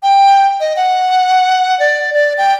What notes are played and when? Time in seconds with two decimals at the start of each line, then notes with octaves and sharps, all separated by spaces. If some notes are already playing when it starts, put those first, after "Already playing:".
0.03 G5
0.60 D#5
0.76 F#5
1.80 D5
2.14 D5
2.38 G5